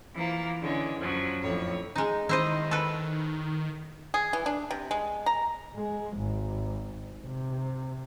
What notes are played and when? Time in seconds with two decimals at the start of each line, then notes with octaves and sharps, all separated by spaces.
0.14 E3 F3 A#3
0.61 D3 E3 G#3 C#4
0.99 F#2 F3 F#3
1.42 F2 A2 D3 C#5
1.96 G#3 D#4
2.29 D#3 E4 C5 D#5
2.71 A4 B4
4.14 G#4
4.33 E3
4.46 D4
4.71 C3
4.91 G#3
5.26 A#5
5.77 G#3
6.18 G#1
7.25 C3